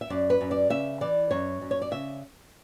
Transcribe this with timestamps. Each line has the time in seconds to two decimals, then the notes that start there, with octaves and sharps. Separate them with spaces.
0.01 E5
0.10 F#2 D5
0.30 B4
0.41 F#2
0.51 D5
0.70 C#3 E5
1.01 E3 D5
1.31 F#2 C#5
1.61 F#2
1.71 C#5
1.82 D5
1.91 C#3 E5